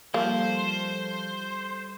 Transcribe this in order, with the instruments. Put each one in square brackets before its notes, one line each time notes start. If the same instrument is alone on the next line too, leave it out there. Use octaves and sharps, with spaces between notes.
[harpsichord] D3 G3 A3 [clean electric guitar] F3 [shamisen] A#3 [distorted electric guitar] C5